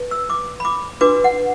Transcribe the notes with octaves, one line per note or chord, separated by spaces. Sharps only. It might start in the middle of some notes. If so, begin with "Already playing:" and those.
Already playing: B4
E6
D6
B5
D6
D4 F#4 B4 D6
F#5